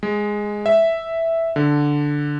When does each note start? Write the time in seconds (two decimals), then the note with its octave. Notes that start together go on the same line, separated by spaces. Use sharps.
0.03 G#3
0.66 E5
1.56 D3